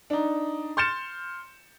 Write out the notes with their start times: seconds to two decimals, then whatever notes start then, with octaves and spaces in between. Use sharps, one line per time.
0.10 D4 D#4
0.77 C6 F6 G6 A6 C#7 E7